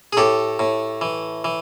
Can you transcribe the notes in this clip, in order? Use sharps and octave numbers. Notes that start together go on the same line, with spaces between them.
G#4
A2 G4 A4
A2
E3
E3